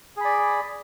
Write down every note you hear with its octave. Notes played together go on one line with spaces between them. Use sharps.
G#4 D5 B5